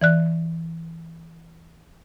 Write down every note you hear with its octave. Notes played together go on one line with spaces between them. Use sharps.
E3 D5 F#6